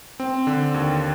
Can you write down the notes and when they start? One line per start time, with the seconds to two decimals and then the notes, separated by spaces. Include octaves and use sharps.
0.20 C4
0.47 D3
0.74 D#2